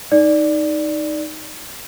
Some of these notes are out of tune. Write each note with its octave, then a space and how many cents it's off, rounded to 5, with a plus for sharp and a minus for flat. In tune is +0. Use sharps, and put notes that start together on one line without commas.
D#4 +0 D5 +0